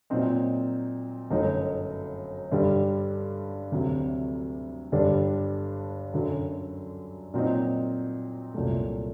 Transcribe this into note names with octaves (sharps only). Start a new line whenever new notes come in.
A#2 F#3 C4 D#4
G1 F#2 F#3 A3 D#4
G2 D3 G3
D2 C3 F#3
G1 G2 D3 G3 D4
F#2 D3 F#3
A#2 F#3 C4 D#4
C2 A#2 F#3 A3